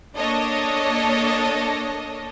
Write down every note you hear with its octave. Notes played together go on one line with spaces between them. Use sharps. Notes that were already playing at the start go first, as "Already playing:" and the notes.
A#3 D4 A4 C#5 D#5